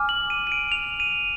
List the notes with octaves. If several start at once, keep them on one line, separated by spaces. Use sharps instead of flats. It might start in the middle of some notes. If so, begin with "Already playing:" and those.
Already playing: G#5 D6 F6
F#7
D#7
D#7
D7
F7
D#7